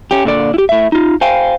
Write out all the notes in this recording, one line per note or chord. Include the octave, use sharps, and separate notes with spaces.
C#4 G4
A#2 D3 D5
E4 G4
A2 E5
D#4 F4
C5 F5 G5 G#5